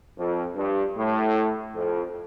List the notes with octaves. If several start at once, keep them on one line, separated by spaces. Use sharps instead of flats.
F2
G2
A2
F2